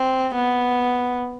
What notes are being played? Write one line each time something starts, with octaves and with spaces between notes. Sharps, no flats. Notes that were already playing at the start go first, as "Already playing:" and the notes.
Already playing: C4
B3